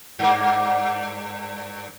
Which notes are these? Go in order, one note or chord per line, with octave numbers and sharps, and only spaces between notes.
G2 A#3